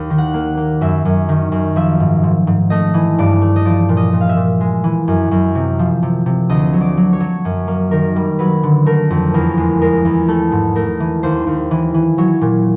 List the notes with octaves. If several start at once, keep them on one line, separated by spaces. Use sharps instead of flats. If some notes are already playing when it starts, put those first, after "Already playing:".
Already playing: D#2
D#3
F#5
A#3
A#3
F#2 E5
F#2
D#3
F#2
F3 E5
G#2
G#2
G#2
A3 D#5
E3
G2 D5
A3
D#5
F3 D5
A#2
D#5
A#2
F5
E5
A#2
G#3
E3
F#2
F#2
C3
F3
C3
C3
D2 D#5
F#3
D5
F#3
C#5
F#3
F#2
A#3
D#3 A#4
G3
F#3 B4
D3
A3 A#4
F2
E2 A#4
G#3
G#3 A#4
E2
A3 A4
G#2
A3 A#4
E3
D#2 C5
D#2
E3
E3
F#3 C#5
A#2